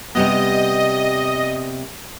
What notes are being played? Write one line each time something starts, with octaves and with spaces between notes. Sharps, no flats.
C3 G3 B3 D#5